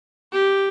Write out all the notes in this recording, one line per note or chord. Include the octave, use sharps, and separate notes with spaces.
G4